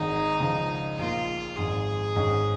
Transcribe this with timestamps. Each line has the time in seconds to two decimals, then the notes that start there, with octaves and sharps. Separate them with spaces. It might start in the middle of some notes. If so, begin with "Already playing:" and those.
Already playing: G#1 G#2 D#3 G#3 D#4
0.40 C#2 C#3 F3 G#3
0.98 A#1 A#2 A#3 F4
1.56 G#1 G#2 F3 G#4
2.15 G#1 G#2 G#3 C#4